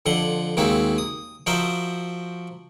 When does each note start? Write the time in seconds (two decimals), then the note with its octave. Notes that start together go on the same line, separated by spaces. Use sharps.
0.06 F2 D3 F#5 C6
0.57 D#2 G#3 A#3 C4 F#4 E5
0.98 D#6
1.47 F3 F#4 A#4 C5 D#5 E5